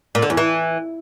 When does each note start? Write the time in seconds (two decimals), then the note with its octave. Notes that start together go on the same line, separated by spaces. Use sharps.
0.15 A#2
0.22 D3
0.30 E2
0.37 E3